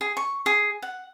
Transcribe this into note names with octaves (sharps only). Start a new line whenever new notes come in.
G#4
C#6
G#4
F#5